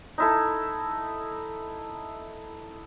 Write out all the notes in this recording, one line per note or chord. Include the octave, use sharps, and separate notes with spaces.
D#4 E4 A4